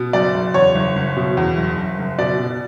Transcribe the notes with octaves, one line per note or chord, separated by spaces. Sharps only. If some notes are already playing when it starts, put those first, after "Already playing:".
Already playing: B2
F#1 D5
F#1
E2 C#5
F#1
F#1
B2
E2
F#1
F#1
F#1
B2 D5
B2